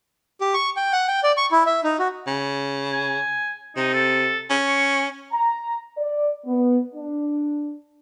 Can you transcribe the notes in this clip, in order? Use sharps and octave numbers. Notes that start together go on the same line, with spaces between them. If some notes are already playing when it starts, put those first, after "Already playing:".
G4
C#6
G5
F#5
G5
D5
C#6
E4
E5
D#4
F#4
C#3
G#5
C3 D#4
A4
C#4
C#6
A#5
D5
B3
D4